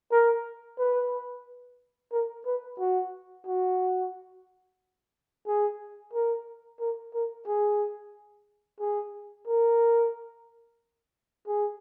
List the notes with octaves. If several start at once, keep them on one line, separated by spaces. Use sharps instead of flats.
A#4
B4
A#4
B4
F#4
F#4
G#4
A#4
A#4
A#4
G#4
G#4
A#4
G#4